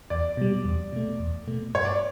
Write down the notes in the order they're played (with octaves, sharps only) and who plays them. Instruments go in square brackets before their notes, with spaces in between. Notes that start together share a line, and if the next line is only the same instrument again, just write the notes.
[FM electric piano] E2 [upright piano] D5
[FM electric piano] B2 G3
E2
B2 A3
E2
B2 A3
[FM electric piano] G2 [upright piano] C#5
[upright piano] D5